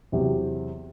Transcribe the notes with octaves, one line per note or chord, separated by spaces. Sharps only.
E2 C3 F#3 C4 G4